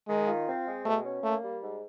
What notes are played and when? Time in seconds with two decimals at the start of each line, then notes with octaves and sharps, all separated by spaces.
0.08 D#3 G#3
0.28 F4
0.47 C4
0.66 G#3
0.85 B2 A3
1.04 C#4
1.23 A3 A#3
1.43 G3
1.62 G#2